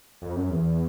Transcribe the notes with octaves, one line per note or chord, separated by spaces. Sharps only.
F2
F#2
E2